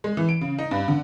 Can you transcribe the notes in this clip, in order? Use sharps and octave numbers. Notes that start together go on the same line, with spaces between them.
G#3
E3
D7
C#3
D#4
G2
D3